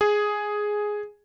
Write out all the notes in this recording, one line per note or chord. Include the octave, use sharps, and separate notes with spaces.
G#4